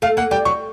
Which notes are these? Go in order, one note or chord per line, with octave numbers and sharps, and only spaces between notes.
A3 F5
A#3 F#5
G3 G5
F#3 C#6